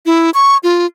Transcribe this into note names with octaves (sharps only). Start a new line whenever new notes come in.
E4
C#6
F4